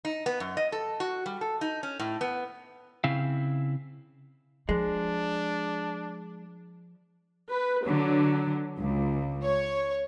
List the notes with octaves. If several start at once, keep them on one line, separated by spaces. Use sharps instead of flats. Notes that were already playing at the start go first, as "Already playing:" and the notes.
D#4
B3
F#2
D#5
A4
F#4
G3
A4
D#4
C#4
A2
B3
C#3 C4 E4 F5
F3 G#3 D4
B4
D3 F#3
C#2
C#5